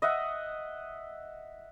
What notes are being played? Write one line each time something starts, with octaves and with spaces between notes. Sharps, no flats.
D#5 E5 F#5